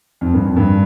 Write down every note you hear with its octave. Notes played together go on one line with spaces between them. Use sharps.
F2
G2
F2
G2